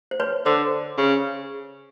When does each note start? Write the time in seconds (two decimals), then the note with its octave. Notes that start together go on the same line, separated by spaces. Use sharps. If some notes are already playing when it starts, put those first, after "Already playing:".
0.11 C5
0.20 B4 C#5
0.46 D3 C5
0.98 C#3